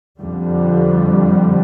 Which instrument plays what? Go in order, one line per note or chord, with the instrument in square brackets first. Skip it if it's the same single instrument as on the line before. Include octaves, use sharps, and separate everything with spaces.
[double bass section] F2 D3 G3